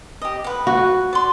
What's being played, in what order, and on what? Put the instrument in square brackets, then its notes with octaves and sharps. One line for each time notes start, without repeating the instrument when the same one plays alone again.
[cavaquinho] G4 D#5
B4 F#5
[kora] F#4
[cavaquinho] D5 C6